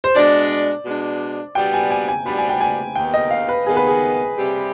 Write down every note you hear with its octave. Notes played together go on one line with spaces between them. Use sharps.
C5
B2 G#3 D4 D5
B2 G#3 D4
B2 G3 B3 D4 G4 G5
G#5
G#5
G#5
B2 G3 B3 D4 G4 B5
G#5
G5
G#5
D#2 D#3 B3 G5
D#5
F5
B4
D#2 D#3 B3 G#4
B4
G#4
C3 G3 C4 G4